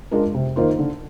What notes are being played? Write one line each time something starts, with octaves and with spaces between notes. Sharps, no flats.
G#3 D4 F4 A#4
C3
D#3 A#3 F4 C5
D3